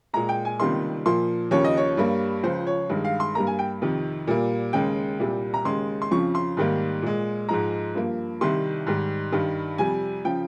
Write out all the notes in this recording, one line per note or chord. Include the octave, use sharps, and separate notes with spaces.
A#2 G#3 A#5
G5
G#5
C#2 C3 D#3 G3 A#3 C6
A#2 F3 A#3 C6
D#2 C#3 F3 C#5
D#5
C#5
G2 G3 A#3
C#2 C#3 F3 C5
C#5
G2 D#3 G#3
F5
C6
G2 G3 A#3 A#5
G#5
G5
F2 C3 D#3
A#2 G3 A#3
D#2 C#3 G#3 G5
C2 A#2 G3
A#5
D#2 C#3 G#3 C6
C6
F2 C#3 F3 C#6
C6
G#2 D#3 G3 A#3
A#2 G#3
G#2 F3 G#3 A#5
G2 F3 A#3
C2 C3 D#3 G3 C6
G#2 D#3 G3
G2 D#3 G3
F2 C3 G3 G#5
C#3 F3 G5